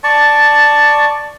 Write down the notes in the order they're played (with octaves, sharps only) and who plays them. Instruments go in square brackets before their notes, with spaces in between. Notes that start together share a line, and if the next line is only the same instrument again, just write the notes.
[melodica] D5 A5 C#6